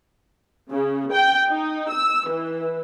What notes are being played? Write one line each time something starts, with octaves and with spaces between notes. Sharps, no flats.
C#3
G5
D#4
E6
E3